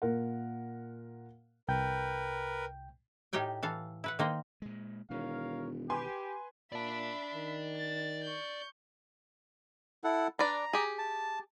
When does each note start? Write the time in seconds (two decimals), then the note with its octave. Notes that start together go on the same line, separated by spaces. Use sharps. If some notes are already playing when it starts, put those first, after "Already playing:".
0.02 A#2 A#4 F#5
1.68 C2 A#4 B4 G5 G6
3.33 A2 D#4 G4 A#4 G5 G#5
3.63 E3 A4 F5
4.04 E4 B4 F#5
4.19 D#3 A#3 C5 D#5
4.62 A#2 G#3
5.10 E1 B2 D#3 A#4 C#5 F5
5.90 G4 B4 G#5 C6
6.72 A#2 D5 E5 A5 B5
7.34 D#3
7.76 A6
8.24 C#6 G6
10.04 E4 A4 F#5
10.39 D4 B4 D5 A#5
10.73 G4 G#4
10.98 A5